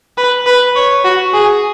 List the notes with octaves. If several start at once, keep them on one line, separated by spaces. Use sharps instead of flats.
B4
B4
C#5
F#4
G#4